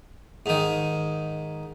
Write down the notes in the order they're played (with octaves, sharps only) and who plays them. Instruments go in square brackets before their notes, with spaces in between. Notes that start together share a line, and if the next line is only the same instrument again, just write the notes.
[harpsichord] G#2 D#3